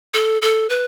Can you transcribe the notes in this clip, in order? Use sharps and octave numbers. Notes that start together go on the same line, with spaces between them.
A4
A4
B4